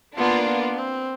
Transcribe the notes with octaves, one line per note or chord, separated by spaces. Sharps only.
A#3 B3 D4 F4
B3
C4